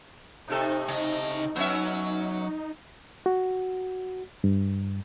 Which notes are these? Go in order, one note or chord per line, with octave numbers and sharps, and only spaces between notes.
A2 C3 D#4 A4
C#3 D#5
F#3 B3 C#4 E5
F#4
G2